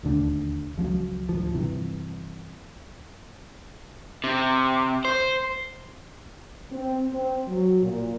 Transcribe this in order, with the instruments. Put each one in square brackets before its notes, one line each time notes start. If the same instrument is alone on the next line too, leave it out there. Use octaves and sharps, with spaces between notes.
[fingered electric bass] D#1 D2 D3
C#2 F3 F#3
D1 A#1 F3
G2 C3 E3
[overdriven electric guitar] C3
C5
[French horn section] C4
C4
F#3
A#2